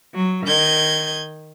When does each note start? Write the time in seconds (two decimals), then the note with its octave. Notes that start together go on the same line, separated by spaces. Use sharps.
0.15 F#3
0.47 D#3 G6 G#6